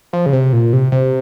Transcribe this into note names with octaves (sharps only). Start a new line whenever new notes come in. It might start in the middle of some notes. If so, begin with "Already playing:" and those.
F3
C#3
C3
A#2
C3
C3